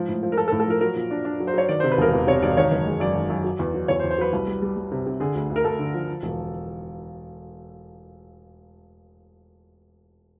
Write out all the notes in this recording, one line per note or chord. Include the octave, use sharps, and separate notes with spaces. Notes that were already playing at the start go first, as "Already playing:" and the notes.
Already playing: G#2 F3
A2
F3
A#4
F3 A4
A4
A2
A4
F3 A#4
F#3 A#4
A#2
D4
D4
F#3
C5
F#3 C#5
D#3 D5
C3 C5
B4
E1 A#4
E2
C3 C#5
E1 D5
D#3 C#5
F#1
G#3
F#2 D5
D#3
F#2
F#3
E2
F#3
E2 C#5
C5
E2
C5
F#3 B4
C2
G3
G3
G3
C3
C3
D3 G#4
D2
D2
A#4
D2 A4
D3
F3
F3
E1